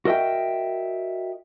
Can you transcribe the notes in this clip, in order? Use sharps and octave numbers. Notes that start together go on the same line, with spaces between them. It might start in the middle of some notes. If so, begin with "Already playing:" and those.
F#4 A#4 D#5 E5 G5